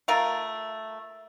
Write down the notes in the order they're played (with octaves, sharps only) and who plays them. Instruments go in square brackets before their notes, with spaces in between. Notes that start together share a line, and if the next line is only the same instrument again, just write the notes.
[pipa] A3 F4 A#4 F5